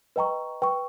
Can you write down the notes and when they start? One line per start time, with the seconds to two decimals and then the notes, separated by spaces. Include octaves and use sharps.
0.16 B4 D#5 G5 A#5 C#6
0.62 B4 G5 C#6